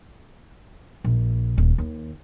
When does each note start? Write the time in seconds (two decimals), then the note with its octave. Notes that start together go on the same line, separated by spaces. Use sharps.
1.04 A#1
1.58 D#1
1.78 D#2